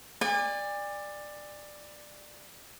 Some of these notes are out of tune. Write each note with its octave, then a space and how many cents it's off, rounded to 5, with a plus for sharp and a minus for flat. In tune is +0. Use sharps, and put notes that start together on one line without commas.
D5 +15 G#5 -40